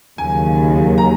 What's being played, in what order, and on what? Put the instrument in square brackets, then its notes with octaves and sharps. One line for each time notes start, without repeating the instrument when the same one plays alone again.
[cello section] D#2 C#3 F#3 [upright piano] G#5
[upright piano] A#5